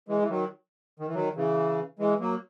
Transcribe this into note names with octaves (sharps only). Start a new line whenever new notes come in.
E3 G#3
E3
D#3 F#3
D#3
E3
D#3 F#3
C#3 E3
E3 G#3
F#3 A#3